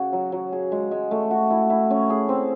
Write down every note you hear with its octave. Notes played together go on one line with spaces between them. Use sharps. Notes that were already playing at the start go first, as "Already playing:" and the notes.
Already playing: C#3 F#4
F#3
F#3
G#4
G#3
G#3
A3
F#4
E4
E4
C#4
G#4
C4